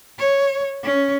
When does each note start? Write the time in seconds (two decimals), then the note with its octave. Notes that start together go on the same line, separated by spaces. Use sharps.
0.19 C#5
0.83 C#4